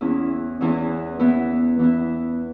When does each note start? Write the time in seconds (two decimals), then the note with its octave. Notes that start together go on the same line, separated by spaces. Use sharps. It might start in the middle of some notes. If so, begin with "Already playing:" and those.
0.01 E2 E3 C#4 E4
0.61 E2 E3 C#4 E4
1.19 E3 B3 E4
1.79 E3 B3 E4